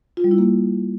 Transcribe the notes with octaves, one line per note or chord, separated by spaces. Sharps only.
F4
G3
E4
A#3